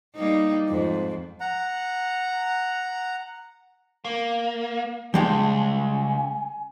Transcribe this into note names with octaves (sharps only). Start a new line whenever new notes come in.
G3 A#3 D#4
F2 G#2
F#5 A#5
A#3
C#2 G3 G#3 G5 A5
G#5